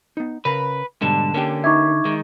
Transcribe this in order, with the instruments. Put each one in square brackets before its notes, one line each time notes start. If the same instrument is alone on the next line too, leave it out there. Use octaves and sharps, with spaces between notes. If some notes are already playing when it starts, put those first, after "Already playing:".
[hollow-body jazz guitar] B3 D#4
[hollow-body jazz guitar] C#3 A#4 B5 [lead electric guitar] B4
[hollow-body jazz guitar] G#2 B2 G3 [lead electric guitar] D3 [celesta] A5 E7
[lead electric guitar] D3 [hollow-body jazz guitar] A#3 C#4 G4
[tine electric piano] D#4 E5 [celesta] C#6 D6 G#6
[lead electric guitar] D#3 [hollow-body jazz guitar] G#3